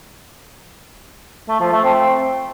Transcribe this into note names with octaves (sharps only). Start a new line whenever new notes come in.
A3
F3
A3
C4